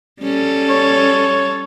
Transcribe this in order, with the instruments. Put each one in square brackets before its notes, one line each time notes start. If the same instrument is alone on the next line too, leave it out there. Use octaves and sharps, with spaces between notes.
[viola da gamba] G3 C#4 A4
[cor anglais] C#5